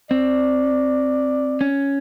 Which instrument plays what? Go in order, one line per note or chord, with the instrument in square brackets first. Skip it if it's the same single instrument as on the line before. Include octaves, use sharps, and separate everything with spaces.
[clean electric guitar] C4 [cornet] D5
[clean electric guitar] C#4